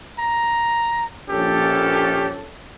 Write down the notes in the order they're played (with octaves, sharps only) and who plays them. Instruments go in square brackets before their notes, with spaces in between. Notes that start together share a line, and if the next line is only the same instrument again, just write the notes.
[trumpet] A#5
[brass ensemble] A#1 C#4 A4 [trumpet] G4